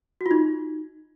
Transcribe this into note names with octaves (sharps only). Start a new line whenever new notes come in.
F#4
F4
D#4